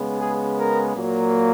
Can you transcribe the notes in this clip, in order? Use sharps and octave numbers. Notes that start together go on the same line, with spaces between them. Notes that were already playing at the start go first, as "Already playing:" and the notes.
Already playing: C#3 G#3 B3
G#4
A#4
A#2 F#3 A#3